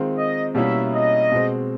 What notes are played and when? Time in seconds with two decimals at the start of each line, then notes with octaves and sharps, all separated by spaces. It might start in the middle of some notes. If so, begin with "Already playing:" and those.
Already playing: D#3 G#3 C4 F4
0.16 D#5
0.55 B2 G3 A#3 C#4 E4 E5
0.93 D#5
1.31 B2 G#3 C4